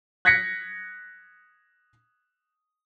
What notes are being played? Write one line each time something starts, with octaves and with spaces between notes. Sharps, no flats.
F#6 G#6 A#6 B6 C#7